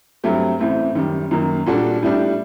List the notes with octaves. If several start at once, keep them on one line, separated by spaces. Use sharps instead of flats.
G2 F#3 A3 C4 G4
A1 A2 A3 C4
F#2 D#3 G3
F#2 D#3 F#3 A#3
A#2 G3 D4 F#4 A4
A2 G3 D4